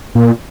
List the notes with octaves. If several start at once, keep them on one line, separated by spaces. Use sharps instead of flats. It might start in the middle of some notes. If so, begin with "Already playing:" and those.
A#2